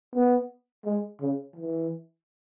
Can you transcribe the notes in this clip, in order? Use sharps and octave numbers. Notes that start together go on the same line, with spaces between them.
B3
G#3
C#3
E3